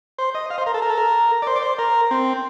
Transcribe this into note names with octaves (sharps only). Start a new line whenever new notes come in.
C5
D#5
F5
C5
A#4
A4
A#4
A4
A#4
D5
C5
D5
C5
A#4
C4